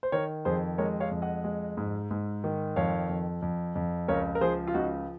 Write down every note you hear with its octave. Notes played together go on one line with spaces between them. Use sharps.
C5
D#3 A#4 C#5
F2 G#4 C5
G#3 A#4 C#5
C#5 F5
F2
D#5 F#5
G#3
G#2
G#2
D#3
F2 C#5 F5
F2
F2
F2
C#2 A#4 C#5
A#4
F3 G#4 C5
F4
C#2 D#4 F#4